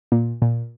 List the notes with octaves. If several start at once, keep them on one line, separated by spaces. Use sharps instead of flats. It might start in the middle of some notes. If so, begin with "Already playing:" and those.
A#2
A#2